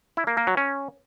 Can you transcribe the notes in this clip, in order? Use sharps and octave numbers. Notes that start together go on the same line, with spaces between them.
E4
A#3
A#3
F#3
C#4